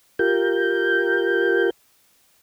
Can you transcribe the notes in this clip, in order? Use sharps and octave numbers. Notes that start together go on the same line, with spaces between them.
F4 G4 A#4 G6